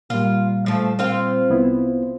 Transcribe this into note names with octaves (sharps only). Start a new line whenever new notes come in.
A#2 G3 F4
F3 A3
C4 F4 F5
C2 B3 E4